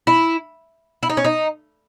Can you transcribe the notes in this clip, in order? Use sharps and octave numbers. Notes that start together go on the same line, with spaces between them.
E4
E4
D#4
C#4
D#4